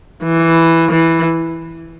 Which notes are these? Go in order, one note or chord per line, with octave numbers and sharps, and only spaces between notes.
E3
E3